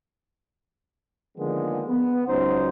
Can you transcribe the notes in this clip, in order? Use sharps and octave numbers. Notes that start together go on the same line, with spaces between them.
D3 D#3 F3 G#3 A#3 B3
B3
C#2 F#3 C#4 D#4 C5